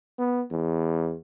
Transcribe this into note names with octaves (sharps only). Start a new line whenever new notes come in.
B3
E2